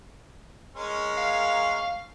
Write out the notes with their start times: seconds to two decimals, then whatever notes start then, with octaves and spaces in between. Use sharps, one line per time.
0.75 G#3 C#4 A#4
1.18 F5